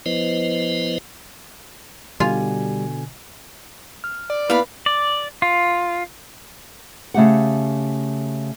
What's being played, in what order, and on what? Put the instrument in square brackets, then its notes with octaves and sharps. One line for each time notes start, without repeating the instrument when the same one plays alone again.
[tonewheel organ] F3 B3 E4 B4 C5 D#5
[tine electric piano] B2 D3 G#5 [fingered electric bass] G3 [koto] F4
[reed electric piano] F6
[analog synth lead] D5
[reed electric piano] A#3 B3 E4 [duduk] B4 [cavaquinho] F5 B5
[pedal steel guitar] D5
F4
[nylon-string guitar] C#3 A3 G4 F#5